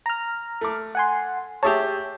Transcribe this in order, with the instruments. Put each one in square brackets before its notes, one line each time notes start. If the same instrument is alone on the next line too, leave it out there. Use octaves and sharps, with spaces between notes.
[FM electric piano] A#5 F6
[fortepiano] A3 D6
[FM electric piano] F#5 G#5 C6
[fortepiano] G4 G#4 A5 [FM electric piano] C#5 E5